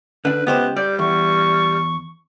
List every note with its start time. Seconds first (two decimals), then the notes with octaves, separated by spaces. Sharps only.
0.25 D3 D4 B4
0.47 C#2 B3 G4 C5
0.76 G3 D5 G6
0.99 E2 C#6